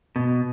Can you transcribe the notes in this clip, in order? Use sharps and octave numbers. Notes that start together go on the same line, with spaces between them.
B2